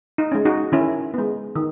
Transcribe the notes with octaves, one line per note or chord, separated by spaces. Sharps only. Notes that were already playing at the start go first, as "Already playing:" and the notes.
D#4
G#3 C#4
D#4 F#4
D#3 C#4 E4
G#3 B3
D#3